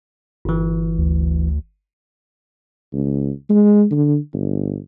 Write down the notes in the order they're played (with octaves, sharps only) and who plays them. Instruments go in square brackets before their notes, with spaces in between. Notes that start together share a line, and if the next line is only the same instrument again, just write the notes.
[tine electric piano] G1 E3
[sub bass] D2
[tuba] C#2
G#3
D3
G1